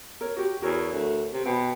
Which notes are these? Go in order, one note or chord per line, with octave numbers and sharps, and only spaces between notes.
A#4 C#5
F#4 G4
E2 F#4 A#4 C#5
D2
C3
B2 G5 B5